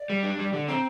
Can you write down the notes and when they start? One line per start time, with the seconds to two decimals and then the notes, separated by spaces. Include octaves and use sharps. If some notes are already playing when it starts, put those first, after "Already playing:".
Already playing: D5
0.10 G3
0.23 D4
0.39 G3
0.53 D3
0.68 C4 A#5